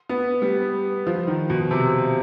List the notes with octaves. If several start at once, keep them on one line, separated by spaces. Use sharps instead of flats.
B3
G3
F3
D#3
B2
C3